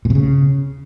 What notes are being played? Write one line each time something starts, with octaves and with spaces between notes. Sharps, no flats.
A#2
B2
C#3